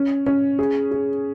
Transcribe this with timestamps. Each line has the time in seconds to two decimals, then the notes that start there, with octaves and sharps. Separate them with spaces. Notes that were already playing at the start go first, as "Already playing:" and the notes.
Already playing: C#4
0.26 C#4
0.59 G#4
0.91 G#4